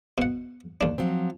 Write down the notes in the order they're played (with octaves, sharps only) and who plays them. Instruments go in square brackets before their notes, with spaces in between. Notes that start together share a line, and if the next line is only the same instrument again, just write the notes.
[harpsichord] B2 F#5
D#2 D4
[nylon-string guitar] F3 F#3 C4